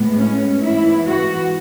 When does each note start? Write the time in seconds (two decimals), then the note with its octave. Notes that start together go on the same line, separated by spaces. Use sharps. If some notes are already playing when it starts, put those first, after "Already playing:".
Already playing: A2 G#3 B3
0.16 C#4
0.61 G#2 E3 B3 E4
1.07 F#4